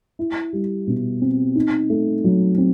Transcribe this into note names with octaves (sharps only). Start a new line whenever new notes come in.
E4
G3
B2
C4
D#4
A3
F#3
C4